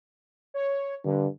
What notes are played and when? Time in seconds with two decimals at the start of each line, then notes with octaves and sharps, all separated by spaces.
0.54 C#5
1.05 G2 D3